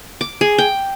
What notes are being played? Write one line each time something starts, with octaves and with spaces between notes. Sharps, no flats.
D6
G#4
G5